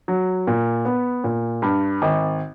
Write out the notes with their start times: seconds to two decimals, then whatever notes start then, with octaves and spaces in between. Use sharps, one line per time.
0.08 F#3
0.47 A#2
0.85 B3
1.24 A#2
1.62 G2
2.02 G#1